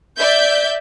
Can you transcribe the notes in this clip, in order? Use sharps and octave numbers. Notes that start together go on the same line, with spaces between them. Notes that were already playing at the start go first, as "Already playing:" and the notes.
D5 E5 G6